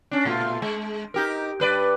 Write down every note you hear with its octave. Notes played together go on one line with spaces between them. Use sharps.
C#4 D4
A#2 A3 F4
G#3
D#4 G4 A#4
G2 B4 D5